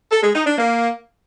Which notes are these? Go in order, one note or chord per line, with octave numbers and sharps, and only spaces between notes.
A4
G#3
D#4
D4
A#3